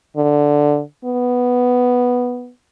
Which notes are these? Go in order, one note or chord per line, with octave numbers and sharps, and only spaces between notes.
D3
B3